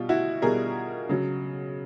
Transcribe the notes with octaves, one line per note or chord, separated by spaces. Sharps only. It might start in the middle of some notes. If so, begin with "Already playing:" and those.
Already playing: B2 G3 F4
E4 F#4
B2 G3 G#4 A#4
C#3 F#3